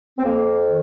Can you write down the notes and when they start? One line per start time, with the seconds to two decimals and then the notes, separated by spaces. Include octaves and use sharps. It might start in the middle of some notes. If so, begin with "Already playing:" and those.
0.18 C4
0.24 F2 A#3
0.66 D#3